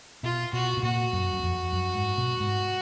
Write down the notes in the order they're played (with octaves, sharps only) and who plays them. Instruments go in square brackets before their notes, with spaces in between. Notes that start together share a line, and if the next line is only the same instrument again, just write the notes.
[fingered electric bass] B2 [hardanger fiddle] F4
[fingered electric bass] B2 [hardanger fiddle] F#4
[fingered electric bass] B2
[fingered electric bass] A#2 [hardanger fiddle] F#4
[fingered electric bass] F#2
F#2
F2
F#2
G#2
B2
G#2